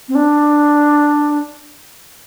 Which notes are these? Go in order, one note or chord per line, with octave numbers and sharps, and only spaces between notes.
C4
D4